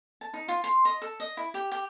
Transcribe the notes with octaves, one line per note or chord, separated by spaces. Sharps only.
A5
D#4
F4
C6
D#5
A4
D#5
E4
G4
G4